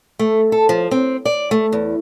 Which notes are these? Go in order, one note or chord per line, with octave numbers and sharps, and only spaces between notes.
A3
A4
F3
C4
D5
A3
E2